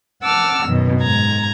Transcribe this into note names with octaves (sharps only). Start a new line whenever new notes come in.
F#5 A5 D6 E6 F6
F#2 B2 D#3
G#2 A#5 G#6